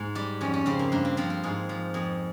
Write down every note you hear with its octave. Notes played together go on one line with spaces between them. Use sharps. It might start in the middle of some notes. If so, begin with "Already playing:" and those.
Already playing: G#2
G3 G4
F2 C#4
C#4
C#3 C4
A#3
G2 A#3
C4
F3 C4
C4
G#2 G#4
F3
F2 G#4